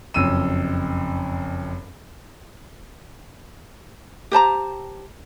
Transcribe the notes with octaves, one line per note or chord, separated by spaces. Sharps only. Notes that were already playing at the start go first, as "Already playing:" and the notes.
F#1 F2 E6 D#7
G4 C5 A5 A#5